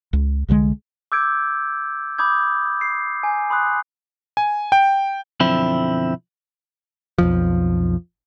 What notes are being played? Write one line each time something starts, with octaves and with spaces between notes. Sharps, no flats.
C#2
C2 D3 E3 G#3
D6 E6 G6 G#6 D7
B5 D6 D#6 G6 G#6
C7
G#5
B5 C6 D#6 F#6
G#5
G5
B1 F#2 D3 F3 C4 E4
B1 F2 F3